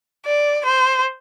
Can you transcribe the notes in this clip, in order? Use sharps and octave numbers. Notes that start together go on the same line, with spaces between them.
D5
C5